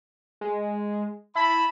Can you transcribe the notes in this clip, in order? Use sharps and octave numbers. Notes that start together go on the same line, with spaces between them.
G#3
E4 A5 B5